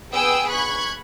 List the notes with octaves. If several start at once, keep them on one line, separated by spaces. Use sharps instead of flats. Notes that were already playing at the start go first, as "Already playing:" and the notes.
B3 G#4 G5 D#6 E6 D7
B5 C#6 F#6 G#6